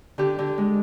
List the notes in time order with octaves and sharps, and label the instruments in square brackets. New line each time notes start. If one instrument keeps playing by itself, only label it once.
[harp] D3 G4
D3
G#3